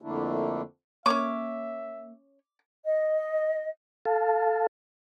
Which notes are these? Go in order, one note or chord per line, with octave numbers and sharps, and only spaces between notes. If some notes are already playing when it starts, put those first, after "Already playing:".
F2 D3 A3 A#3 D4 E4
A#3 C#4 C#5 E5 D6
D#5
A4 F5 A5